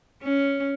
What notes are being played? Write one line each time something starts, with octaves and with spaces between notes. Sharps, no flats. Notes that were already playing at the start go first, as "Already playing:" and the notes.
C#4